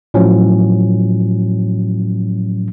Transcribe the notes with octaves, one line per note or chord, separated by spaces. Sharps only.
A2 F3 F#3 C#4